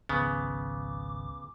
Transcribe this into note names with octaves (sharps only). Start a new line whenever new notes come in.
G#1 C#2 C#3 F3 B3 D6